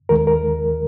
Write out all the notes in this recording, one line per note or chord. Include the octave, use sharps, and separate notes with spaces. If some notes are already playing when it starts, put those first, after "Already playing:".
D#2 D#3 G#3 A#4
A#4